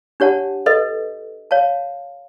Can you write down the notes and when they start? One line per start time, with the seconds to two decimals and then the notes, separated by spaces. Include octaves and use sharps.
0.20 D4 G4 C#5 F#5 A5
0.66 A4 B4 D#5
1.51 C#5 F5 A5